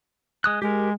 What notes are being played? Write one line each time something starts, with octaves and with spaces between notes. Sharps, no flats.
G#3 D#6 F#6
G#3 G4 A#4